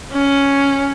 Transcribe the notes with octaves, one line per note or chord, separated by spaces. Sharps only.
C#4